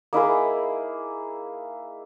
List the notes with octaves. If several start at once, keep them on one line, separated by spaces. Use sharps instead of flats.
A#3 D#4 E4 G#4